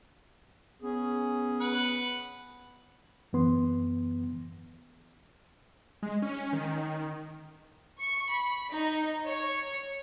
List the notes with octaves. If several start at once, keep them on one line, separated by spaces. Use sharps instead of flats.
B3 C#4 G#4
B4 F#5
F#2 E3 B3 C6
G#3
C#4
D#3
C#6
B5
D#4
C#5